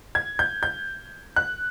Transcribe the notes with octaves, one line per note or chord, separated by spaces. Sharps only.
G#6
G6
G6
F#6